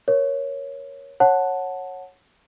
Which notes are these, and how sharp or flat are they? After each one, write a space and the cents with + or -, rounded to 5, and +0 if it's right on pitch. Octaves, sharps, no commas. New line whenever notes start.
A#4 +20 C#5 +0
C#5 -15 F#5 -10 A5 +0